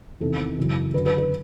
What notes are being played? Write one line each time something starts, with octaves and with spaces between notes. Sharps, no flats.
E2 C3 D#3 A4
F#2 C#3 E3
F#2 D3 B4
B4
B4